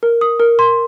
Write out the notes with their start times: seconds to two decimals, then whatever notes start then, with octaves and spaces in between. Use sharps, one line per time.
0.03 A#4
0.21 D#6
0.40 A#4
0.59 C6